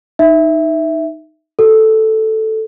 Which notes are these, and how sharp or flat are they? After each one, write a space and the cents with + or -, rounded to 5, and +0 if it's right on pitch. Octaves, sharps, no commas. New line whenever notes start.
D#4 +0 E5 +0
F#4 +25 A4 +0